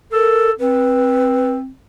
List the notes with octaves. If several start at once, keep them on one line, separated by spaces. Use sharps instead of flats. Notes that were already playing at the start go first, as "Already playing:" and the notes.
A4 A#4
C4 B4